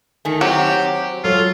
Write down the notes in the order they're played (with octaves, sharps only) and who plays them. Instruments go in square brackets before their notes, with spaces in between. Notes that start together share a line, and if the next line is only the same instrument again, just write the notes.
[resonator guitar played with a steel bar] D#3 A3 [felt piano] G#5
[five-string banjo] F#3 [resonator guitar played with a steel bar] C4 [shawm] G4
[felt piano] F#3 A4 C#5 [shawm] F4